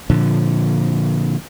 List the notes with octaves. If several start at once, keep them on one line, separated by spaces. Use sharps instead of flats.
A#2 D3 F3